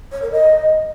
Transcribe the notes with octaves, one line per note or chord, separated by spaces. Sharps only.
C#5
A#4
D#5